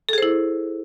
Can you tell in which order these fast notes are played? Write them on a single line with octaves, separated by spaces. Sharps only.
A4 G#4 C5 E4